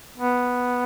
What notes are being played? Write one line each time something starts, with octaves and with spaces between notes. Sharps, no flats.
B3